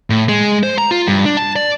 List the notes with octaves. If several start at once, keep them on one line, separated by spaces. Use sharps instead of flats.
A2
G#3
C5
A#5
F4
G2
D4
A5
D5